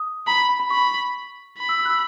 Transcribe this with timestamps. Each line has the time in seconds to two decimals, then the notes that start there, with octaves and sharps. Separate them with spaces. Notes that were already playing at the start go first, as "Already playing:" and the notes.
Already playing: D#6
0.27 A#5 B5
0.49 B5
0.59 B5
0.70 B5 C#6
1.58 B5
1.69 E6
1.79 E6
1.85 F#6
1.90 E6